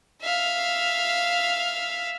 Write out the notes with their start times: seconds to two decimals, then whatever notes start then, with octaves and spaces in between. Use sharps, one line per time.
0.22 E5 F5